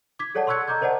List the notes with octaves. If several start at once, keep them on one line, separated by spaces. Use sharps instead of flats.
D6 G#6 B6
G#4 A4 C#5 D5 F#5 A5
C6 C#6 E6 F#6 G#6 C#7
D#5 A#5 D6 G6 G#6
A#4 C5 D5 D#5 F#5 A5